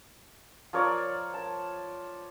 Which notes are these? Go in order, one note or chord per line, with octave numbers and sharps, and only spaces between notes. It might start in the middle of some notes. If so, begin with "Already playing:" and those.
F3 A#4 C#5 D5
A5